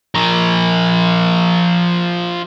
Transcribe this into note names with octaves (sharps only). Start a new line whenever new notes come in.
F3 A#4